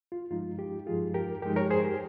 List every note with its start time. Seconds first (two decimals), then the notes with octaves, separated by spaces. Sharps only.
0.12 F4
0.30 G2 F3 G#3 D#4 F4
0.59 D#4 G4
0.86 G2 F3 G#3 D#4 F4 G#4
1.14 G4 A#4
1.42 G2 F3 G#3 D#4 G4 A#4
1.56 A#4 C#5
1.71 G#4 C5
1.84 G4 A#4